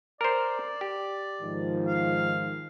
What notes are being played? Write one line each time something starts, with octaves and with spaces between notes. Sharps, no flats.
A#4 C5 D5
G4
G#2 D#3 F3
F5